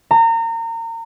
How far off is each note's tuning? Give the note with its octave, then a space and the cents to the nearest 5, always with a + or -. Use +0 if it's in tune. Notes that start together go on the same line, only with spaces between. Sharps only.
A#5 -30